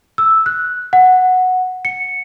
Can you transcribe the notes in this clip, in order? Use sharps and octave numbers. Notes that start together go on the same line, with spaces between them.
E6
F#6
F#5
C#7